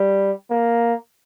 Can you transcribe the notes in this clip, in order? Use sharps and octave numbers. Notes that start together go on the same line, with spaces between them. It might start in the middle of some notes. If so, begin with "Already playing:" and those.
Already playing: G3
A#3